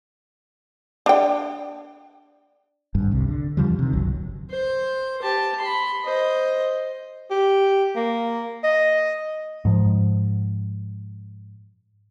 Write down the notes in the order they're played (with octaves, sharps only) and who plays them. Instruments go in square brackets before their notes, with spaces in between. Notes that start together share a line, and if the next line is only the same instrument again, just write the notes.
[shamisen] D4 G5
[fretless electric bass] G#1 G2
C2 C3
D3
E2 C#3 F3 G3
C3 D#3
G1 C#2 F#3
[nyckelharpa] C5
G4 A5
B5 C6
C5 D#5
[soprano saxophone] G4
A#3
D#5
[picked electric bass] G#2 F3